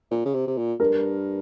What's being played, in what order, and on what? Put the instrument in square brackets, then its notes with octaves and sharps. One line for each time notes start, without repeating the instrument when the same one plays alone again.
[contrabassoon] A#2
C#3
C3
C3
A#2
[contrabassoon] G2 [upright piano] A#4